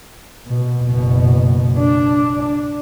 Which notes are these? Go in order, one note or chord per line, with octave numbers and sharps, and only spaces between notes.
B2
F#1 B2
D4